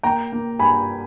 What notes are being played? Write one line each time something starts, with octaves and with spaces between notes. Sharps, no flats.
A#3 G5 A#5
A#3
G2 G#5 B5